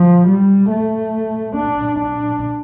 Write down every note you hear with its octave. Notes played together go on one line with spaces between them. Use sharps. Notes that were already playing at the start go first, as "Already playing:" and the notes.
Already playing: F3
G3
A3
D4
D4